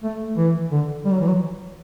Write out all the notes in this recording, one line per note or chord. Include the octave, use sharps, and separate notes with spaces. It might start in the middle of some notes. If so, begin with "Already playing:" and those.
A3
E3
D3
G3
F#3
E3
F#3